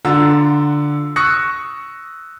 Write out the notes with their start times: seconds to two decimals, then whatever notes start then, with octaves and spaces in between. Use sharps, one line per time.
0.05 D3 F4 F#5 A#5 E6
1.16 C#6 D#6 E6 F#6 A#6 C#7